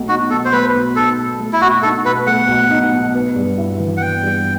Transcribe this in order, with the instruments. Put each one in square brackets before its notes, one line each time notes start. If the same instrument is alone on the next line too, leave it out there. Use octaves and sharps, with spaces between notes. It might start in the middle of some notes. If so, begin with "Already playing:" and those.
Already playing: [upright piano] B1 A3
[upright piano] D#4 [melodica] F#4
[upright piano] B2 [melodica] A4
[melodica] C5
[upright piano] A3 [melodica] B4
[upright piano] B1
[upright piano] D#4 [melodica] A4
[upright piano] B2
A3
[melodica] E4
[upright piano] B1 [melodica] F#4
[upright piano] D#4 [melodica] A4
[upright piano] B2 [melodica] B4
[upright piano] A3 [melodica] F#5
[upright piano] B1
D#4
B2
B3
G2
E4
E3
[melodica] F#5
[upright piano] B3 [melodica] G5
[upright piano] G2